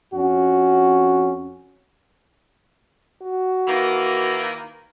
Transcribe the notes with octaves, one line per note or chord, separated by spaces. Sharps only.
F2 C#4 F#4
F#4
D#3 E3 A#3